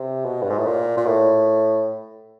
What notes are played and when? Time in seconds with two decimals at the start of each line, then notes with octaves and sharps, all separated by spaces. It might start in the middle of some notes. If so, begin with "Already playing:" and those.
Already playing: C3
0.25 B2
0.42 G2
0.50 G#2
0.58 A2
0.65 A#2
0.97 A#2
1.06 A2